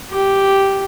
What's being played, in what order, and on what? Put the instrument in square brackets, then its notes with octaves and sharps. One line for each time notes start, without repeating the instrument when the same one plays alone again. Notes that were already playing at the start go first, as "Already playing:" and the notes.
[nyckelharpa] G4